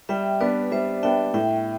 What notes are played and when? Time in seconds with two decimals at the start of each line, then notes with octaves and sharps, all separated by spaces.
0.09 G3 E5 G5
0.40 B3 D4 B4 D5
0.72 G3 C5 E5
1.03 B3 D4 E5 G5
1.34 A2 E5 G5